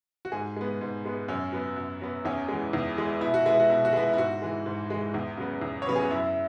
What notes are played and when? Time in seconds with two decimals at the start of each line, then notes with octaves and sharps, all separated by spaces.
0.25 F#4
0.32 G#2 G#4
0.56 G#3 B3
0.81 G#2
1.05 G#3 B3
1.28 F#2 C#4
1.52 F#3 B3
1.76 F#2
2.01 F#3 B3
2.25 E2 C#4
2.48 E3 G#3
2.73 E2
2.97 E3 G#3
3.21 B2 E4
3.34 F#4
3.46 G#3 B3 E4
3.60 F#4
3.70 B2 E4
3.85 F#4
3.93 G#3 B3 E4
4.13 E4
4.17 G#2 F#4
4.42 E3 G#3
4.66 G#2
4.90 E3 G#3
5.14 E2
5.37 C#3 F#3 B3
5.62 E2
5.82 C#5
5.86 C#3 F#3 B3 B4
5.96 G#4
6.03 F#4
6.11 F#2 E4